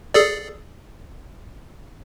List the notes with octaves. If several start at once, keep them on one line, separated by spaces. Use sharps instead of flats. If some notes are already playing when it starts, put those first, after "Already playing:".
G#4 A4 D5